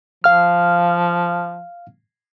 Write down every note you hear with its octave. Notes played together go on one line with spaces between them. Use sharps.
F3 F5 F6